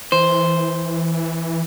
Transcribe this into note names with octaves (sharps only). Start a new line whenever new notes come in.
E3 C5